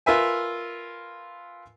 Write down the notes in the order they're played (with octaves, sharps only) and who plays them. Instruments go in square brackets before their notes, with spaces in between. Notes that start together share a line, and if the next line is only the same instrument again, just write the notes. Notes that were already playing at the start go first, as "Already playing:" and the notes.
[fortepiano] F4 A#4 B4 E5 G#5